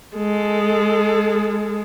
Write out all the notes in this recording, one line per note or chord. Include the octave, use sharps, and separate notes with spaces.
G#3 A4